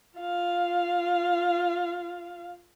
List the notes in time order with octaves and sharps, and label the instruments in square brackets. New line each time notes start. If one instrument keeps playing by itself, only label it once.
[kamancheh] F4 F5